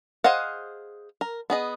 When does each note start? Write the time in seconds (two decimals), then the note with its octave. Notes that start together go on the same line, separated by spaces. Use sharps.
0.24 G#4 C5 D#5 F5 F#5
1.21 A#4
1.50 B3 G#4 D#5